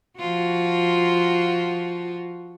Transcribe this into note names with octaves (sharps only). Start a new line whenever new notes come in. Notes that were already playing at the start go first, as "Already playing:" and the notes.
F3 F4 F#4